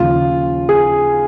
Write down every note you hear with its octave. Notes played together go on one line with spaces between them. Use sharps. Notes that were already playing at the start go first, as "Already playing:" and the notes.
Already playing: D#2 C#3 F3 F4
G#4